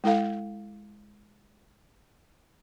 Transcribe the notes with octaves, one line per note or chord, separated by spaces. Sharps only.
G#3 E4 A4 F5